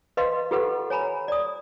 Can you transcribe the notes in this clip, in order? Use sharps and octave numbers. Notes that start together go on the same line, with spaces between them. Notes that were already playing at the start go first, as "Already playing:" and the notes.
B4 D#5 F5 C6
F4 G4 A4 B4 F#5
C#5 G#5 A#5 B5
D5 D#6